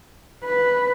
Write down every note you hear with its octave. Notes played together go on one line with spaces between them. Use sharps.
B4